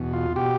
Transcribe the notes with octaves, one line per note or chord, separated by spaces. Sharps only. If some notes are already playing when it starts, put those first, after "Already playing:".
Already playing: E2 B2
F4
B2 G4